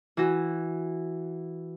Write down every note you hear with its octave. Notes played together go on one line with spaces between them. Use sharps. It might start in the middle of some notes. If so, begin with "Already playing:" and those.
E3 F#4